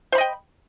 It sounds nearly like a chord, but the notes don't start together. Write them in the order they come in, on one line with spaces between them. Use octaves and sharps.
C5 B5 D#5 G5